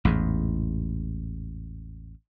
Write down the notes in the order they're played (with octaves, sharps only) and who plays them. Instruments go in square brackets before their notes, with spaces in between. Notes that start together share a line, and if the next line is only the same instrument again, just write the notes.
[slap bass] A1 E2 G#2